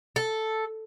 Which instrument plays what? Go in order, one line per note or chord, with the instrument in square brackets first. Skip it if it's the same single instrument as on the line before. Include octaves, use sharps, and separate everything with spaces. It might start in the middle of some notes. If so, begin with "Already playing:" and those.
[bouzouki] A4